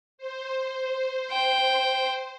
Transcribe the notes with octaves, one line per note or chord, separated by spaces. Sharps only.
C5
G5